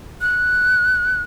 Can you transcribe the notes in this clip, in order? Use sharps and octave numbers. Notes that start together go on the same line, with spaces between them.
F#6